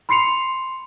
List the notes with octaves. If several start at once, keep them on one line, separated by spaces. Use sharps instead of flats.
B5 C6 C7 C#7 F7